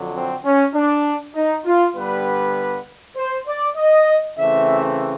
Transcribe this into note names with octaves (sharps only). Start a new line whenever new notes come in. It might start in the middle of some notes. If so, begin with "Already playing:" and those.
Already playing: F2 D3 F#3
C4
C#4
D4
D#4
F4
G2 D3 G3 B3 B4
C5
D5
D#5
C#3 E3 A3 C4 E5